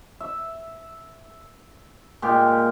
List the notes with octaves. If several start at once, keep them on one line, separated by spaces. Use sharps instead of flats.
E5
A#2 G#3 G4